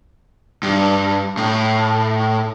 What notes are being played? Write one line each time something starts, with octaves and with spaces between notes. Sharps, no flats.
G2
A2